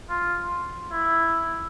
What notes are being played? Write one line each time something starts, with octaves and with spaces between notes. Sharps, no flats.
F4
E4